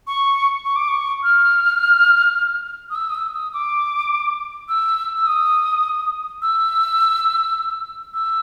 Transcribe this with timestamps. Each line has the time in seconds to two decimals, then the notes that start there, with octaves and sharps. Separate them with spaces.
0.07 C#6
0.65 C#6
0.76 D6
0.88 C#6
1.23 F6
2.90 D#6
2.95 E6
3.10 D#6
3.15 E6
3.34 D#6
3.54 D6
4.69 E6
5.16 E6
5.27 D#6
6.42 E6
8.14 E6